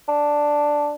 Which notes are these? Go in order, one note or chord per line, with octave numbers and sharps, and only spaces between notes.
D4